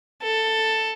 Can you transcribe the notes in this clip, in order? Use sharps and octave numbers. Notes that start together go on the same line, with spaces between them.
A4